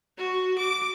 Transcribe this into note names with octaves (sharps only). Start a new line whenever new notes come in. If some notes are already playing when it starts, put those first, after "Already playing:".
F#4
D6